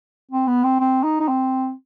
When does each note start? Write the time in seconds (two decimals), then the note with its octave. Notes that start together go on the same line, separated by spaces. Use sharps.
0.31 C4
0.47 B3
0.63 C4
0.80 C4
1.03 D#4
1.20 D#4
1.28 C4